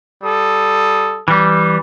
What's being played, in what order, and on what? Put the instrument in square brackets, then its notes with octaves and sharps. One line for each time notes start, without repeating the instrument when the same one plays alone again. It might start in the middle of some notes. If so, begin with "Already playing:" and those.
[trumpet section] G3 A4 D#6
[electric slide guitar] E3 G3